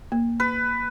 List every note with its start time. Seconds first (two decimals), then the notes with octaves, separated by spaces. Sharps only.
0.12 A#3
0.40 B4